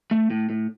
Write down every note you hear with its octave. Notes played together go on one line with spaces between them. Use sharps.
A3
A2
A2